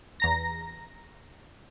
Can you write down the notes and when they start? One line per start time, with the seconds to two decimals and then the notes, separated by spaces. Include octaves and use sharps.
0.20 E2 A#5 A#6